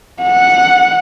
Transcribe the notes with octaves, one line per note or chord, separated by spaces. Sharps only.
F#5